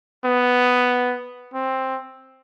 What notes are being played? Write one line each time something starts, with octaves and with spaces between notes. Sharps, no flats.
B3
C4